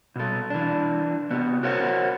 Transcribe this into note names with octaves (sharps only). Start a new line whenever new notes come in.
B2 A4
E3 D4
C3 B3
F#4 A#4 C5 C#5 F#5